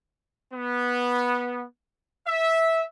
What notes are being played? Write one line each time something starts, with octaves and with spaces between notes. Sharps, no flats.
B3
E5